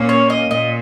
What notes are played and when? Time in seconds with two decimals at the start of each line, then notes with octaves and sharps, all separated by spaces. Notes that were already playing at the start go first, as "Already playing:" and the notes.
Already playing: A#2 A#3 C#4
0.09 C#5
0.30 D#5
0.50 A#2 D#5